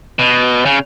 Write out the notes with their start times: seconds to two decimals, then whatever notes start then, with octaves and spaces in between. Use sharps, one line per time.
0.19 B2
0.65 C#3